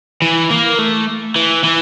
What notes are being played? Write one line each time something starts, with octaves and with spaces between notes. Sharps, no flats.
E3
A#3
A3
E3
E3